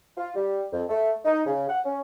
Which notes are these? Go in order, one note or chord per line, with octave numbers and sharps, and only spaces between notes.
F4
G3
F2
A3
D#4
C#3
F#5
C#4